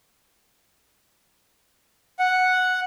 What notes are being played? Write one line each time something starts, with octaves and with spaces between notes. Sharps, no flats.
F#5